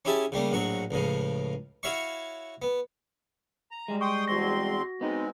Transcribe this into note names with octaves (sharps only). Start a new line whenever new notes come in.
C#4 E4 G4 G#4 E5 A5
C#3 G3 A3 A#3
A#1 A2 F#3 F#4 C#6
C#2 A2 C#3 F3
E4 F#4 C#5 E5 F5 C#6
B3
A#5
G3 G#3
G5 C6 C#6 D#6
E2 C4 F#4 C6 A#6
G#3 B3 C4 D#4